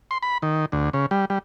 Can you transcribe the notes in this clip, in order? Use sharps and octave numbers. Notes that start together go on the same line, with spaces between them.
C6
B5
D#3
D2
C#3
G3
G3